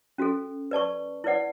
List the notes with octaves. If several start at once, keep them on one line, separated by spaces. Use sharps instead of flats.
C#4 F#4 A4
B4 D5 A5 C#6
E4 B4 D5 F#5